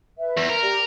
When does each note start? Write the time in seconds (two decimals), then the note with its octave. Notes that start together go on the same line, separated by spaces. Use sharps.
0.18 B4 E5
0.37 E2
0.49 A#4
0.62 G4 D5 A#5